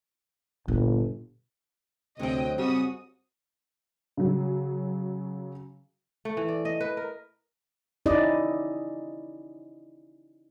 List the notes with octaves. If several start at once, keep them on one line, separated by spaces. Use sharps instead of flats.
G1 A#2
D2 C3 F#3 C4 D#5 G5
F#2 C#3 G3 C4 F#4 D#6
C#3 F#3
A3
E3
D5
D#5
B4
A#4
C#4 D#4 E4 G4 D5 D#5